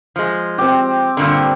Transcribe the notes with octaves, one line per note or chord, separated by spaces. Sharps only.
F3 G#3
C4 G4
G2 A#2 D3